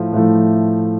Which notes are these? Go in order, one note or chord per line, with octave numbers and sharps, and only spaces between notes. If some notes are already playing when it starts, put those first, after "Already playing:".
Already playing: A2 F3 A3
A2 F3 A3